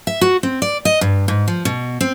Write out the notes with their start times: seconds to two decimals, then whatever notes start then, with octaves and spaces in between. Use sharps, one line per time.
0.07 E5
0.21 F#4
0.43 C4
0.62 D5
0.85 D#5
1.01 G2
1.28 G#2
1.48 F3
1.65 B2
2.01 C4